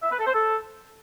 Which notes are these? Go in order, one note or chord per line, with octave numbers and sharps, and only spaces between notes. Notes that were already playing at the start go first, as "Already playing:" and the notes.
E5
B4
A4
C5
A4